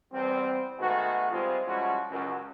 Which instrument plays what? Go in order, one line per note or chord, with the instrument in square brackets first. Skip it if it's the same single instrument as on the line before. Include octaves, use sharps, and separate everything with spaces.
[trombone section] E2 G3 C4
D#3 G#3 A3 B3 F#4
G3 G#3 C4 F4
F3 G3 G#3 C#4 E4 F#4
C#2 F#2